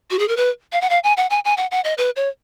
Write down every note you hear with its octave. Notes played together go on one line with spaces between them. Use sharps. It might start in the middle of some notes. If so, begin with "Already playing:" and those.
F#4
G#4
A#4
B4
F5
F#5
F5
G#5
F#5
G#5
G#5
F#5
F#5
D#5
B4
C#5